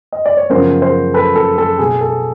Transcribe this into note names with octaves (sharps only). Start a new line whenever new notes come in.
D#5
D5
C#5
F#2 C#3 F3 G#3 B3 A#4 C5
A#4 C5
A4 B4
A4
A4
B2 G#3 B3 G#4
A4